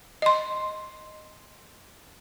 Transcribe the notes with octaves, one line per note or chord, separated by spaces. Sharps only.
D#5 C6